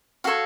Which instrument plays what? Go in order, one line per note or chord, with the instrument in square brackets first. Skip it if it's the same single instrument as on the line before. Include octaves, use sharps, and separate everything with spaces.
[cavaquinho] F#4 A4 C#5 F5